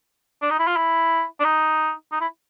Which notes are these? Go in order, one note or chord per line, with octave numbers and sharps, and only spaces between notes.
D4
D#4
E4
F4
E4
D4
D#4
D#4
E4